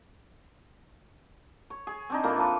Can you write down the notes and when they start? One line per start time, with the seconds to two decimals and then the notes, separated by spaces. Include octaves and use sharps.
1.70 C#5
1.87 G#4
2.10 C4 D4 D#4
2.24 A#2 E3 A#3 A4
2.37 E3 F3 A4 B4